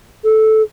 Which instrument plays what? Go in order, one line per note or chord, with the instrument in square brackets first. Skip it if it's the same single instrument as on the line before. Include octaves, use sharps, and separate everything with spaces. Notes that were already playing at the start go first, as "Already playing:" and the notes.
[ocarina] A4